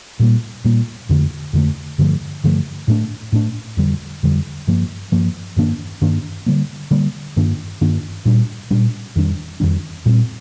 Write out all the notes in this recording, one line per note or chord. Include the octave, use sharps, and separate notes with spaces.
A#2 G3 A#3
A#2 G3 A#3
F2 D3 A3
F2 D3 A3
G2 D3 F3 A3
G2 D3 F3 A3
A2 A3 D4
A2 A3 D4
F2 D3 G3
F2 D3 G3
G2 F3 A#3
G2 F3 A#3
G2 D#3 A#3 D4
G2 D#3 A#3 D4
D3 G3 A#3
D3 G3 A#3
G2 D#3 A#3 D4
G2 D#3 A#3 D4
A#2 G3 D4
A#2 G3 D4
F2 D#3 G3 D4
F2 D#3 G3 D4
A#2 G3 C4